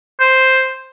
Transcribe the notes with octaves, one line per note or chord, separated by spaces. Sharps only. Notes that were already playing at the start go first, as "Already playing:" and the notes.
C5